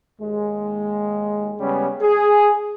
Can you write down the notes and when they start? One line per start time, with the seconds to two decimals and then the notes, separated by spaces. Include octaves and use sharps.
0.21 D#2 G#3
1.60 C#3 G3 G#3 B3 C#4
2.02 G#4